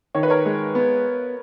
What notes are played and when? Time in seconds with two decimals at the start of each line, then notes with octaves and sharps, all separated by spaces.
0.15 D#3 C#5
0.23 B4
0.30 A#4 C#5
0.45 G#3
0.75 B3